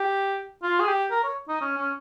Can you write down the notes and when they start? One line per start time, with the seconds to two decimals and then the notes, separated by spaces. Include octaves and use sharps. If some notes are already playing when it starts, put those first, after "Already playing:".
Already playing: G4
0.63 F4
0.80 G#4
0.88 G4
1.11 A#4
1.24 C#5
1.48 D#4
1.61 C#4
1.78 C#4